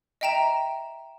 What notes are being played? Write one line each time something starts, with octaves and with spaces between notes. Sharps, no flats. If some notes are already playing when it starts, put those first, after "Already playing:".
D#5 E5 G5 A#5 E7